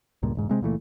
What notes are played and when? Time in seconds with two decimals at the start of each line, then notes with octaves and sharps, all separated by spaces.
0.23 C#2 G2 A#2
0.35 E1 G#2
0.49 C3 G#3 C4
0.61 C#2 A#2 E3 A3